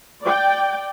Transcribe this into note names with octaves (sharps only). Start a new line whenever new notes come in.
D5 G5